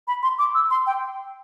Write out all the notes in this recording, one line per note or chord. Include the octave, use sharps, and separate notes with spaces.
B5
C6
D6
E6
C6
G5